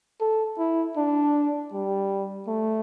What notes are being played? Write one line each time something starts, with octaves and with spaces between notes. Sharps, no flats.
A4
E4
D4
G3
A3